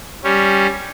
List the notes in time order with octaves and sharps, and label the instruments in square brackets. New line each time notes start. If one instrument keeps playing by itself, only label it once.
[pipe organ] G3 C#4